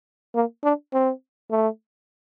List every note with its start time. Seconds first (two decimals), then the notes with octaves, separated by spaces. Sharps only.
0.35 A#3
0.64 D4
0.93 C4
1.51 A3